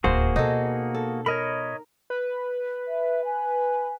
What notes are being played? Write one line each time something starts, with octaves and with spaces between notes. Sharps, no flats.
D1 D#2 A#3 F#4 G#4 C5
B2 D#4 A4
A4
A#4 C#5 D#5 B5
B4
E5
G#5